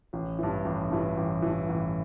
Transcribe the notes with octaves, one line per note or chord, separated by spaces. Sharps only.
A1
G2 E3
A1
G2 E3
A1
G2 E3
A1